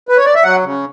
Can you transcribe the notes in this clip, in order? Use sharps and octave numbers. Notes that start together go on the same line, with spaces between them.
B4
C#5
D5
E5
F#3 F#5
C#3